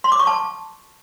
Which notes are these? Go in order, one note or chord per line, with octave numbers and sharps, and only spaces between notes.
C6
D6
C#6
A5